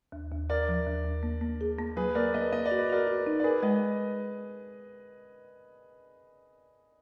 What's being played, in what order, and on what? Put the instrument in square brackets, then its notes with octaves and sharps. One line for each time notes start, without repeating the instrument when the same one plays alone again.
[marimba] D#2
D#2
[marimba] D#2 [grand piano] A#4 D5
[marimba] F3
D#2
D#2
A#3
A#3
G#4
A#3
[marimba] F#3 [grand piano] G#4 B4
[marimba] A#3 [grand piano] A#4 D5
[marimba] A#3 [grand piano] B4 D#5
[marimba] A#3 [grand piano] D#5
[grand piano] D5
[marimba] F#4
[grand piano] B4
[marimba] F#4 [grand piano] A#4 D5
[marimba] F#4
D#4
[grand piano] D5
[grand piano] G#4 B4 [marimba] A#4
[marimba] G#3 [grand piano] B4 D#5